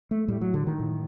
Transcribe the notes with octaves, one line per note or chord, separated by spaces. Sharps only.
A3
A2 G3
F#3
D3
D#3
A2